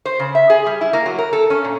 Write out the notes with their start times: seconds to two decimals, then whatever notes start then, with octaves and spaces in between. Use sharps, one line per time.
0.05 C5
0.19 C#3
0.35 E5
0.50 G#4
0.66 G3
0.81 E4
0.93 A#3
1.06 F#3
1.18 A#4
1.33 A4
1.50 C#4
1.64 A#2